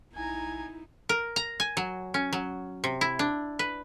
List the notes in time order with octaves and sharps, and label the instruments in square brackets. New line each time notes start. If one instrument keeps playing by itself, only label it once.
[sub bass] A#1 [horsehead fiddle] D#4 E4 [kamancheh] G#5 A#5
[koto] A#4
A#5
G#5
F#3
C#4
F#3
C3
E4
D4
B4